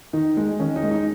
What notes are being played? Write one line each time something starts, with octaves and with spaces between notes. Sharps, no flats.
D#3 D#4
G#3
D#3 C#4
D#4
G#3
D#4